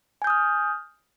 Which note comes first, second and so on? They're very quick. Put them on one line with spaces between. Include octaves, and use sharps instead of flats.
G#5 G6 D#6 F6